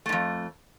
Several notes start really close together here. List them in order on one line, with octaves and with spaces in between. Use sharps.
A3 G#2 F2